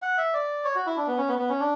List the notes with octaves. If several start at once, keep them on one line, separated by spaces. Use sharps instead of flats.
F#5
E5
D5
C#5
F#4
E4
D4
B3
C#4
B3
B3
C#4
D4